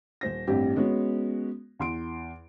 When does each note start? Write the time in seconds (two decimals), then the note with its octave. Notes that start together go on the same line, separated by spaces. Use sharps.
0.21 D#1 C5 A#6
0.47 A1 G2 C4 G4
0.76 G#3 B3 C#4 F#4
1.79 E2 C6 D7